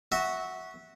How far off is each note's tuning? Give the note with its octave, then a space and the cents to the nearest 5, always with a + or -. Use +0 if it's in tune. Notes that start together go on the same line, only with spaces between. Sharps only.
F#4 +0 E5 -20